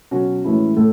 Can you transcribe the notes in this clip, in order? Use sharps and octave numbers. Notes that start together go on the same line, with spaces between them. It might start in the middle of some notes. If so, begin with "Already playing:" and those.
B2 F#3 C#4 F#4
A2 E3 G#3 C#4 E4
A2 A4